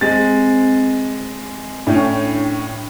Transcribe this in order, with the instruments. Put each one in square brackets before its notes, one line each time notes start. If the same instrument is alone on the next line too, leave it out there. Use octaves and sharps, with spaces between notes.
[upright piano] G#3 A6 [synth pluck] C4
[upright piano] A2 C#4 [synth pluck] D4 E4 G5